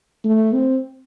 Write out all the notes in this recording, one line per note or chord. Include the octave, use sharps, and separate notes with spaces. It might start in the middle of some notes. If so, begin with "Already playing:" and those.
A3
C4